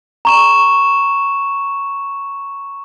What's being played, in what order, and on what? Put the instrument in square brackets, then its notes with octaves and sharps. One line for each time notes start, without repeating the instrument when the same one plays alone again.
[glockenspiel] A#5 C#6 E7